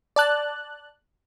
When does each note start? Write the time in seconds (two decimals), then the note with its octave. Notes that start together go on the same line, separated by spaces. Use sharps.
0.16 D5 A5 F#6